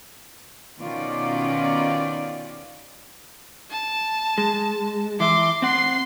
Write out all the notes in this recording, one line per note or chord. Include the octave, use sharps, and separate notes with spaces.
B2 D#3 C#4 F4 D5
A5
G#3
E3 E5 C6 D6
C4 F#5 C6 C7